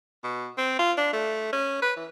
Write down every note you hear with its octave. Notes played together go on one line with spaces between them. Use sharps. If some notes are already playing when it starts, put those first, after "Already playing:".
B2
C4
F4
D4
A3
C#4
B4
E3